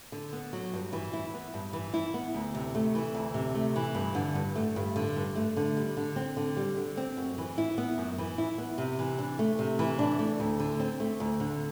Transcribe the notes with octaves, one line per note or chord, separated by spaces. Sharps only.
D3
B3
F#3
G2
E3
E4
B3
G2
E3
E4
B3
D2
C3
A3
E3
D2
C3
A3
E3
G2
D3
G2
A3
G2
D3
G2
A3
D3
G3
D3
C4
D3
G3
D3
C4
F#2
E3
E4
B3
F#2
E3
E4
B3
C3
E3
D4
A3
C3
E3
D4
A3
D2
D3
C4
A3
D2
D3